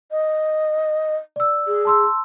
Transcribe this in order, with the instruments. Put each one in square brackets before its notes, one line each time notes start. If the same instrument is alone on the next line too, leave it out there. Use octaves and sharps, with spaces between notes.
[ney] D#5
[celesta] D5 E6
[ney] G#4
[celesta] A5 C6 E6